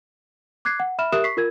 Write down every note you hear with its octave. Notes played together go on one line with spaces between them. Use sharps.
D6 F#6 G#6 C7
F#5
E5 B5 F6 E7
G4 A#4 E5 D#6 F#6 E7
C#6 B6 C7
F4 A#4 G#6